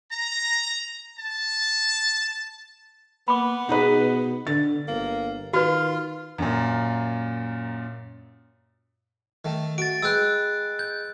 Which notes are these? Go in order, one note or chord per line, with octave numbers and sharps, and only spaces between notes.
A#5
A5
A#3 B3 B5 D6
B2 D#4 G#4 B4
D3 A6
G1 A#3
D#3 F4 F#4 B4 F6
F#2 A#2
D#3 A3
F#4 A6 D7
G#3 B4 G5 E6 F#6
G6